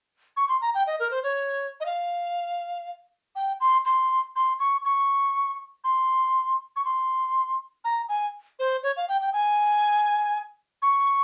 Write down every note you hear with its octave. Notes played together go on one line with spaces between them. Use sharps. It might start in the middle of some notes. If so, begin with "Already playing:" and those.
C#6
C6
A#5
G5
D#5
A#4
C5
C#5
D#5
F5
G5
C6
C6
C6
C#6
C#6
C6
C#6
C6
A#5
G#5
C5
C#5
F5
G5
G5
G#5
C#6